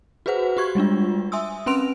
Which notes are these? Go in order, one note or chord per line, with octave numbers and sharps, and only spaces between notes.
F#4 G#4 B4 C5 F#5
F#4 G4 C#6 G#6
G3 G#3 D4 F4
E5 G#5 C6 D#6 E6
C4 C#4 B4 C6 D7 F7